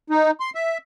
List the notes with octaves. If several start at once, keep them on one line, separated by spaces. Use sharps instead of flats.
D#4
C6
E5